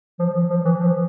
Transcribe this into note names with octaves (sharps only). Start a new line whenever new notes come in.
F3
E3
F3
E3
F3